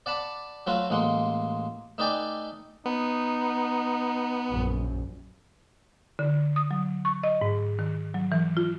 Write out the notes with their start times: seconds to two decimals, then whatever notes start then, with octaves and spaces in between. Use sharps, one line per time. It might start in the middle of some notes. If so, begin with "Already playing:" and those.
0.06 D5 F#5 A5 B5
0.67 F#3 A3 F4 F#4 B4
0.90 A1 G#3 A#3 F#5 C6
1.98 A3 D#4 B4 D5 G5 G#5
2.86 B3 D#4
4.50 A#1 F#2
6.19 D3
6.56 D#6
6.71 F#3
7.05 C#6
7.23 D#5
7.41 G#2
7.79 D#3
8.14 F#3
8.32 E3
8.57 F4